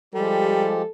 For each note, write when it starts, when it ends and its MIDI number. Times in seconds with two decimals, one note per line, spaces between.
0.14 0.82 53
0.14 0.76 55
0.14 0.82 56
0.14 0.82 67
0.14 0.91 69